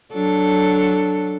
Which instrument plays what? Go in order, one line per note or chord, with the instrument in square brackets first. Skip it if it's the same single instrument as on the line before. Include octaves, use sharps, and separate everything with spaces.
[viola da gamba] F#3 D4 A4